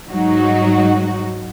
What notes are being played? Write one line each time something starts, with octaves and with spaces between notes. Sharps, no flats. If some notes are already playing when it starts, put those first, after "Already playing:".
G#2 F#3 D#4 F#4